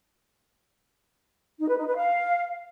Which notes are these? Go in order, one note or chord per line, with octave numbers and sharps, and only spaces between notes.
D#4
B4
D#4
B4
F5